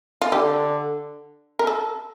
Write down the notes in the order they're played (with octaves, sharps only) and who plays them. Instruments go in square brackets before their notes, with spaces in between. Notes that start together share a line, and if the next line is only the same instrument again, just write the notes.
[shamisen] F4
[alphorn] D3 [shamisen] G4
[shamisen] A#4
A4